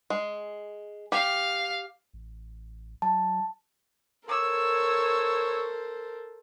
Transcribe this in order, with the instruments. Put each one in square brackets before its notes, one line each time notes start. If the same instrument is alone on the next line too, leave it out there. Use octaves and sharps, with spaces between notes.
[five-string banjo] G#3
[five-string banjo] G4 [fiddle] F5
[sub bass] A1
[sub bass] F#3 [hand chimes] A5
[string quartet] A4 A#4 C5 [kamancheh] C#5 E6